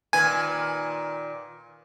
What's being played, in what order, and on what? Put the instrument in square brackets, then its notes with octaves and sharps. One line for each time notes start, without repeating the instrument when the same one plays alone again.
[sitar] A#2 D#3 B4 [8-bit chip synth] G#5